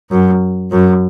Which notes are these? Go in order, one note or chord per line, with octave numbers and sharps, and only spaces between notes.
F#2
F#2